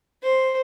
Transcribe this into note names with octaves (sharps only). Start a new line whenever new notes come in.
C5